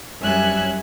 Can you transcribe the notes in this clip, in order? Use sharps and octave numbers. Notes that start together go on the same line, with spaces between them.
F#2 G3 C#4 E5 G#5 F#6